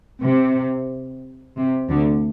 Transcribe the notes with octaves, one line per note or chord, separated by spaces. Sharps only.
C3
C3
D2 D3